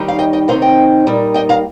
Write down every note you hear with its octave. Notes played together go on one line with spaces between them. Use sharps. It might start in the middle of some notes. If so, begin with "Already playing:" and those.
Already playing: D#3 G3 D#4
F5
D#5 G5
D#5 G5
C3 D#3 C4 D#4 C5 F5
D#5 G5
A#2 G3 A#3 D#4
D#5 G5
F5 A#5